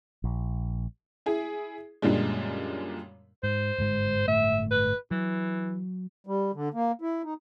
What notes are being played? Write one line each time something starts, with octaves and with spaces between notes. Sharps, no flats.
A#1
E4 G#4
F#2 A#2 D3 G3 G#3
G#2 C5
G1 G#2 G#3
G1 A2 A3 E5
B4
E3 F#3
G3
D3
A#3
E4
D#4